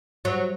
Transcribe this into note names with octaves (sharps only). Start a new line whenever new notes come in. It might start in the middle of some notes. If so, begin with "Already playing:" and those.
F#3